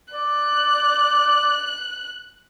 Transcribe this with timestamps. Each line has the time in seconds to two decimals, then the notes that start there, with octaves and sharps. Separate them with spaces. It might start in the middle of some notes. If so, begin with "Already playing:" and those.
0.14 D5 F#6